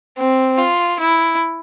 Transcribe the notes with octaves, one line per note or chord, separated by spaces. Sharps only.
C4
F4
E4